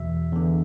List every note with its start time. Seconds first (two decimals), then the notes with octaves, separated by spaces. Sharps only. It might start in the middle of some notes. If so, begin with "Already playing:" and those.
Already playing: E2 B2 E5
0.33 E2 D3